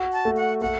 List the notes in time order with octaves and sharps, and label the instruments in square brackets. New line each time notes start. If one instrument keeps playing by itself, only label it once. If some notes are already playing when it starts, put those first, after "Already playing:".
Already playing: [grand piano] F#4
[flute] A5
[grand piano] A3
[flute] F#5
[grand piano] A3 [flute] F#5